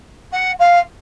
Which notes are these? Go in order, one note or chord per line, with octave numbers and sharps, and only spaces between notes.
F#5
F5